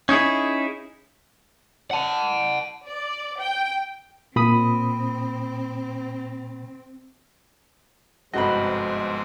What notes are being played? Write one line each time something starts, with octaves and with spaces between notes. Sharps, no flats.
C#4 D#4 E4 G#4
F#5 A5
D5
G5
A#2 C4 B5 D#6
G1 G#2 C3 F3 C4 F#4 D#5 B5